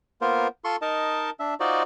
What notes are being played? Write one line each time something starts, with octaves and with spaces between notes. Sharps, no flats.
A#3 B3 F4 A#4 C5
F4 A4 C6 C#6
D#4 A#4 D#5 A5
D4 E5
D#4 F4 F#4 C5 D5 D#5